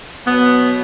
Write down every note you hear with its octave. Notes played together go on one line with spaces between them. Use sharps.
B2 F#3 B3